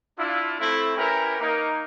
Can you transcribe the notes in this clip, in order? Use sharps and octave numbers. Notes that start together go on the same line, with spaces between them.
D4 E4 F4
A3 C4 E4
C#4 E4 G4 A#4 B4 A#5
A#3 D#4 A#4